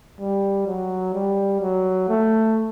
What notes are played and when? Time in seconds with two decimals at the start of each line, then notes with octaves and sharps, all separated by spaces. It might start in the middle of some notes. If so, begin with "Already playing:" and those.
0.20 G3
0.67 F#3
1.14 G3
1.61 F#3
2.08 A3